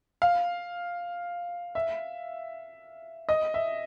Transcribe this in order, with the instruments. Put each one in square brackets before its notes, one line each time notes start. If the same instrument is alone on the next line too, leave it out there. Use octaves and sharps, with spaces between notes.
[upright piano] F5
E5
D#5
E5